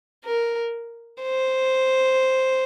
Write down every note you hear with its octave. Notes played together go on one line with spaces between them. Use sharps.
A#4
C5